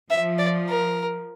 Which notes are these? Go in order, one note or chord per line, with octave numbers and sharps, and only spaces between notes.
F3 E5
D5
A#4